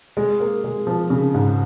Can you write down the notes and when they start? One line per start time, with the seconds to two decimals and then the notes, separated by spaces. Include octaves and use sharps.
0.17 G#3
0.40 A#3
0.64 G#3
0.87 F3
1.10 C#3
1.35 G#2